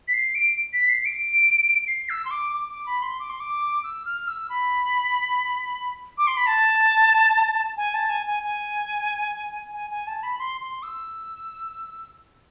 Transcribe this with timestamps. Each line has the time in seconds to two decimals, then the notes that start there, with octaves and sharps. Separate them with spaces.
0.08 B6
0.13 C7
0.35 D7
0.73 B6
0.89 C7
1.05 D7
1.87 C7
2.10 E6
2.25 C6
2.31 D6
2.53 D6
2.69 D6
2.86 B5
3.02 C6
3.19 D6
3.30 C6
3.40 D6
3.84 E6
4.06 F6
4.28 E6
4.50 B5
6.18 D6
6.27 C6
6.37 B5
6.47 A5
7.77 G#5
7.94 A5
8.09 G#5
8.27 G#5
8.43 G#5
9.74 G#5
9.90 G#5
10.07 A5
10.23 B5
10.39 C6
10.61 C6
10.83 E6